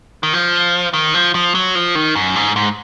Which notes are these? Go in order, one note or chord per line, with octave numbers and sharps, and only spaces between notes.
D#3
F3
D#3
F3
F3
F#3
F3
D#3
F#2
G#2
G#2